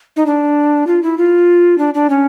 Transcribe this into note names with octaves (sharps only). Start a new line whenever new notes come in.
D#4
D4
F4
E4
F4
D4
D4
C#4